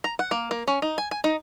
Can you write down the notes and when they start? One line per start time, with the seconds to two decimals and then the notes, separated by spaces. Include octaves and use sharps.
0.04 A#5
0.19 F#5
0.31 A#3
0.51 A#3
0.68 C#4
0.82 D#4
0.98 G#5
1.11 G#5
1.24 D#4